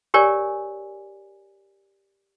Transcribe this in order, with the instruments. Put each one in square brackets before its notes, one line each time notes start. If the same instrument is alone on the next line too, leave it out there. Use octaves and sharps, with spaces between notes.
[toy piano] G4 A#4 C#5 D5 G#5